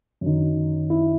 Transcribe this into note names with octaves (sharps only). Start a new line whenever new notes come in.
F#2 D#3
E4